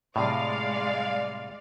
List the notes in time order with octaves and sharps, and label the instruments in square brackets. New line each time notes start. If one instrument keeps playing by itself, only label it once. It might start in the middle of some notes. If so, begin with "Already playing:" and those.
[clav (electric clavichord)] A2 C3 [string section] G#3 D5 F5